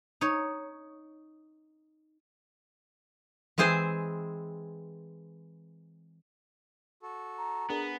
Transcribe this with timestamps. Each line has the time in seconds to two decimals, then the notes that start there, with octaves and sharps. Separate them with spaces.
0.21 D#4 C#5
3.58 E3 G#3 C4 G#4 C5
7.03 F#4 A4
7.38 A#5
7.70 B3 D4 G#4 A#4